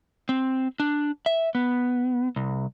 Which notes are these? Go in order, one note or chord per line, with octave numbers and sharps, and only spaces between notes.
C4
D4
E5
B3
C2